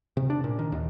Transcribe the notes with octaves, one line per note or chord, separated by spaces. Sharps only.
C3
D4
A#2
D#3
D#2